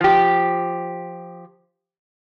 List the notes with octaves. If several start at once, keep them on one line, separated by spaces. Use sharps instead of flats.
F3 G4